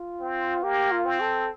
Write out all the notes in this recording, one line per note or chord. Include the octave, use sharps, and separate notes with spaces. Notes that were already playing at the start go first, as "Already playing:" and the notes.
Already playing: F4
C4
A#3 G4
F4
C4
A4